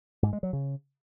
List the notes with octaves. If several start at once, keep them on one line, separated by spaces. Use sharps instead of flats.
G#2
G#3
F#3
C#3